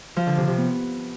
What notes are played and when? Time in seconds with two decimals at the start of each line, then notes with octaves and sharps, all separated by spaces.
0.16 F3
0.27 D3
0.37 C3
0.47 C3
0.58 B3